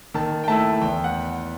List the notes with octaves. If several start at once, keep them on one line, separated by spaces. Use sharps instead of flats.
D#3 A5
G5
A3 E4 A5
E2 G5
F#5